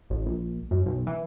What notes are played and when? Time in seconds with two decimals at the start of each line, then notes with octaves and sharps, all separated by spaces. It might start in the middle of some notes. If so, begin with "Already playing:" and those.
0.10 A1
0.26 A#1
0.71 F#2
0.86 B1
1.07 E3